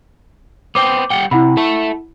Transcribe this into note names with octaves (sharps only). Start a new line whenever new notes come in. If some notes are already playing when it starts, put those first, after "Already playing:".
B3 C5 G5 D6
G3 F#5 G5
C3 E4 F#5 B5
A4 E5 A5